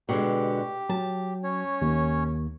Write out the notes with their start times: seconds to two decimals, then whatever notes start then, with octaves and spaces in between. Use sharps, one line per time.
0.09 B2 D3 G#3 G4
0.89 F#3 A5
1.44 C#4 C#5
1.82 D#2